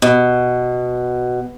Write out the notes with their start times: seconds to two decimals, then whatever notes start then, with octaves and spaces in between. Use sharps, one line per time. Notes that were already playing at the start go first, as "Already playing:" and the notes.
0.02 B2